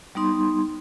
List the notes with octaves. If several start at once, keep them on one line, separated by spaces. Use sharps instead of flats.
G3 B3 D#4 C6